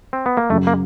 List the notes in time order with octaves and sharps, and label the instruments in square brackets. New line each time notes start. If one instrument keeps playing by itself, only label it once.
[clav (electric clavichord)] C4
B3
A#3
[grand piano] F#2 C#3 F#3 [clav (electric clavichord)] A3
[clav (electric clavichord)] A#3